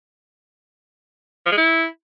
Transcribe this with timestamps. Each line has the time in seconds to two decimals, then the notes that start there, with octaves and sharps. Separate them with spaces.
1.46 F3
1.52 G#3
1.57 E4